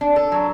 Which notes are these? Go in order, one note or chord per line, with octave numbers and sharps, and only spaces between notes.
D4
A4
F#3